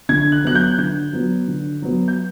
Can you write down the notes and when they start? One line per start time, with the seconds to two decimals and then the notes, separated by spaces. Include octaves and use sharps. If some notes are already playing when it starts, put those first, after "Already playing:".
0.09 D3 G#6
0.32 F#6
0.44 F#3 B3 F#6
0.55 G6
0.78 D3 G6
1.13 F#3 B3
1.48 D3
1.82 F#3 B3
2.08 G6